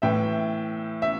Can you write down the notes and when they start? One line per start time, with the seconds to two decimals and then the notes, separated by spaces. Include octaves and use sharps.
0.02 A2 E3 E5 G5
1.02 E5